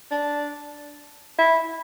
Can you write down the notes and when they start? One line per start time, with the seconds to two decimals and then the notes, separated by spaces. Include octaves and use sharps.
0.11 D4
1.38 E4